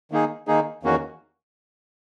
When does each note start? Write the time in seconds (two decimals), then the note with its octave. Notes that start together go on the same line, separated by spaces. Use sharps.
0.11 D#3 A#3 D#4 G#4
0.47 D#3 A#3 D#4 G#4
0.83 E2 D#3 A#3 C#4 F#4